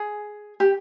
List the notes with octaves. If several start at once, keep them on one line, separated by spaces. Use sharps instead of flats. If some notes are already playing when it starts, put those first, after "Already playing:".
Already playing: G#4
G4